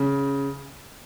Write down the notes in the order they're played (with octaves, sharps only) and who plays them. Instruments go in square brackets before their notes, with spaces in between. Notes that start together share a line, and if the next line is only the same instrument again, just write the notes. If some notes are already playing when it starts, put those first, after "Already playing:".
Already playing: [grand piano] C#3